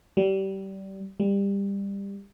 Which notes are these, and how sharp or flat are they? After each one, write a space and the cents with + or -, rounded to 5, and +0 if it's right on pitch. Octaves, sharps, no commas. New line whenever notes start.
G3 -25
G3 +20